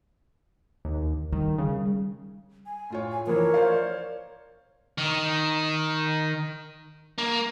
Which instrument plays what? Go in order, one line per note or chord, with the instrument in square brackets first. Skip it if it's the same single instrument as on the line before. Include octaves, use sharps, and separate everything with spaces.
[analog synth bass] D#2
[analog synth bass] D#3 [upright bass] G3
[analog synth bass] C#3
[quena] G#5
[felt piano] A2 F4 C#5
[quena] G#5
[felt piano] E3 F3 [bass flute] A#4 [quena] C#5
[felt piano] C5 D5 F5
[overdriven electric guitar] D#3
A#3